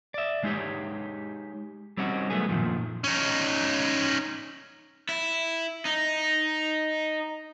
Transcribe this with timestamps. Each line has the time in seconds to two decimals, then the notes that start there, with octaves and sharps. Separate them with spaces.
0.14 D5 E5
0.43 G#3 D#4 G4 C#5
1.97 G3 C4 C#4 D#4 F#4
2.30 F#3 A3 B3 G#4
2.49 F#2 A#2 D#3 F3
3.04 C#4 D#4
5.09 E4
5.85 D#4